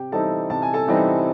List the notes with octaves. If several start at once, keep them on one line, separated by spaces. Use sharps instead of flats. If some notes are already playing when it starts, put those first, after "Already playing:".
Already playing: C3 G4 G5
E3 G3 C4 D#4 A4 A5
C3 A5
G#5
A4 A5
E3 G3 C4 D#4